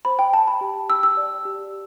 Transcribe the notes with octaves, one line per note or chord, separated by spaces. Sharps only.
C5 B5
G5
G5 A5
B5
G4
G5 E6
E6
D5
G4